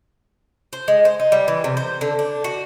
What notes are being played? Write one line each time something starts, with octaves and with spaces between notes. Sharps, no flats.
C5
G#3
C5
D#4
G3
E3
C3
C5
D3
D4
F#4